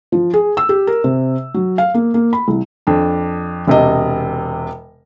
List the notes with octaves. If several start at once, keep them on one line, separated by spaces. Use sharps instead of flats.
F3
G#4
E6
G4
A#4
C3
F#3
F5
A#3
A#3
B5
C2
F2 D4
E1 C3 D#5